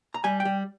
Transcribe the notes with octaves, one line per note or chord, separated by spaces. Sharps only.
A#5
G3 G#5
G5
G3